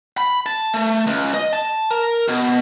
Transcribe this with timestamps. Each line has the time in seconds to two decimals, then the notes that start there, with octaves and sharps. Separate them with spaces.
0.18 B5
0.46 A5
0.74 A3
1.07 C#2
1.34 D#5
1.53 A5
1.91 A#4
2.28 B2